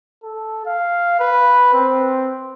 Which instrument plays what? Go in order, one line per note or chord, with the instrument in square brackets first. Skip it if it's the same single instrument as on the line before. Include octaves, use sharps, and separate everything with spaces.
[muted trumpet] A4
F5
B4
C4